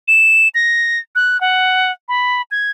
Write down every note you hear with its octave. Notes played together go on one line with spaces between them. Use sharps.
E7
A#6
F#6
F#5
B5
G#6